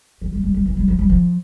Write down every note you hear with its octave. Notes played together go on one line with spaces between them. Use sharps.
E3
G3
G3
G3
E3
G3
F3
G3
F3